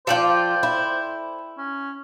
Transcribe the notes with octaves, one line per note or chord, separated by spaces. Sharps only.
F3 F4 A4 C5 D5 G5
E4
C#4